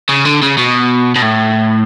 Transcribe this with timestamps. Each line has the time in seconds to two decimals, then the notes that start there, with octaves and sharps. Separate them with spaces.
0.09 C#3
0.25 D3
0.42 C#3
0.58 B2
1.16 B2
1.22 A2